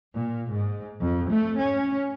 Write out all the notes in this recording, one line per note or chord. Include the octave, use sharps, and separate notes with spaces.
A#2
G#2
F2
A3
C#4